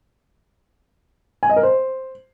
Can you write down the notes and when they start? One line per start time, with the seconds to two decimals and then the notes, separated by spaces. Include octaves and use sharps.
1.43 G#5
1.50 D#5
1.56 A#4
1.63 C5